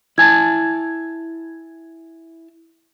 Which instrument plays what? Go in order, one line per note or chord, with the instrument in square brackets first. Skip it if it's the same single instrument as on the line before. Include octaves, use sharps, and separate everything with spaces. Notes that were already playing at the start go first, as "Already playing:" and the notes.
[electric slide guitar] E4 G#5 A5 [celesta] G#6